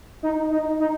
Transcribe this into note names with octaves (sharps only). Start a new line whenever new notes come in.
D#4
D#4
D#4